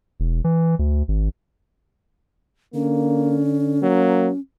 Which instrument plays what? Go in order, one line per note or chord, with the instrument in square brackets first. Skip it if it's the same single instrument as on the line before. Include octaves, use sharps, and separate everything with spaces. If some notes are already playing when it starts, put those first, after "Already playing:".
[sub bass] E1
E3
D2
G#1
[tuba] D3 [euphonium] A#3 [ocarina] C#4
[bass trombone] F#3 [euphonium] A#3